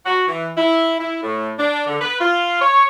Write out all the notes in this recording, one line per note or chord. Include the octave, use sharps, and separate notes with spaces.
F#4
E3
E4
E4
A2
D4
D3
B4
F4
C#5